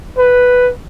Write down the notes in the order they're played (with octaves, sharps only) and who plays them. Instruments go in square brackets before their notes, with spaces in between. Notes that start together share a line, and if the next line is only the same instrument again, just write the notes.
[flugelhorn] B4